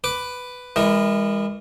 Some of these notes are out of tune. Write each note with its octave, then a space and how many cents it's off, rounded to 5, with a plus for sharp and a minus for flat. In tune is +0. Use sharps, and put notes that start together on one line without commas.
B4 +5 D6 +0
E3 +0 G#3 -35 A#4 +0